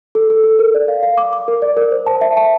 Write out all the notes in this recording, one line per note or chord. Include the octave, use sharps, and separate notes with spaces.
A4
A4
A4
A#4
D5
F5
F5
D6
D6
A#4
D5
A#4
C5
A5
E5
A5